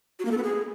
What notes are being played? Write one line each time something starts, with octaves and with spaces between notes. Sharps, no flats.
F#4
A#3
A4
B3
G#4